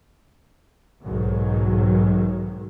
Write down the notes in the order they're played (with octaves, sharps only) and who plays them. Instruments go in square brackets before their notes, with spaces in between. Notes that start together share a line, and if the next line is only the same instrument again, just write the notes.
[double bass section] B1 G#2 D#3 F#3